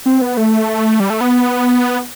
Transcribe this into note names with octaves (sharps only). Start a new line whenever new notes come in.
C4
B3
A3
G3
A3
B3